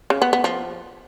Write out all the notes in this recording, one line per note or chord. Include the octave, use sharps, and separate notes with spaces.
C#3
B3
B3
F3